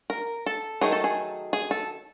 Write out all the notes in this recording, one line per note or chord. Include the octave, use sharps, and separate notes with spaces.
A#4
A4
D#3 F#3 A3 D#4 G#4
A4
G#4
G#4
A4